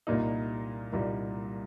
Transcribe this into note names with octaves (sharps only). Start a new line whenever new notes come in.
C2 A#2 G3 A#3 D#4
C2 A#2 G3 A#3 D#4